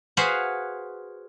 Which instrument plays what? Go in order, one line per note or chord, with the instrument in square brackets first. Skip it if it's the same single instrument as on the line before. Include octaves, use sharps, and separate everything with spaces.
[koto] F#4 G#4 B4 C5 F5 F#5